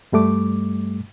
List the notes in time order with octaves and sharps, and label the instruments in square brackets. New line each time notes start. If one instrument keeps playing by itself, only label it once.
[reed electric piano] G2 G3 A3 D6